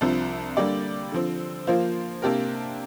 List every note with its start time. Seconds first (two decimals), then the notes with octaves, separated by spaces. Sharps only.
0.01 C2 C3 F3 D4
0.57 D3 G3 A#3 G4 D5
1.12 D3 F3 C4
1.67 F3 A#3 F4 C5
2.22 C3 A#3 D4 G4 A#4